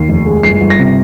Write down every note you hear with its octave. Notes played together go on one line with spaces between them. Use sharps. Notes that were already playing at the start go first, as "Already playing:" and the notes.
Already playing: D#2 C7
F1
G#3
G1 C7
G1
A#6
C3